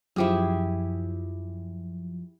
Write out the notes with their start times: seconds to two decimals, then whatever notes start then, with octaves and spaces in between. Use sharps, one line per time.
0.16 F#2 F3 E4 G4 G#4